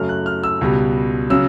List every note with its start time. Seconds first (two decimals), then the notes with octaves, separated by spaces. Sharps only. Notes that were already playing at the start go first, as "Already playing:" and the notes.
Already playing: F#2 C#3 F#3 A3 F6
0.09 F#6
0.26 F6
0.43 E6
0.61 C#2 B2 G3
1.30 C#3 F#3 E6